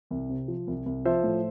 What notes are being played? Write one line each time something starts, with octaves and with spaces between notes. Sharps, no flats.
C2
C3
F3
C2
C2
F3 C5 E5
A2